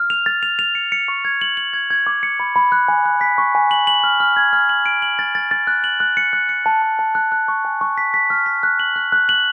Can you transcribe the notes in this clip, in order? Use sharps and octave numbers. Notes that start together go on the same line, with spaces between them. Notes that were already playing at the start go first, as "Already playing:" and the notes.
Already playing: F6
F7
A6
F7
F7
C#7
C#7
C#6
G#6
F#7
F#7
G#6
G#6
D6
C#7
B5
B5
F#6
G#5
F#6
B6
C#6
G#5
F#7
F#7
F6
F6
G#6
F6
F#7
D7
F#7
A6
A6
A6
F#6
F#7
F#6
C#7
F#6
C#7
A5
A5
A5
F#6
F#6
C#6
G#5
C#6
B6
B6
F6
B6
F#6
F#7
F#6
F#6
F#7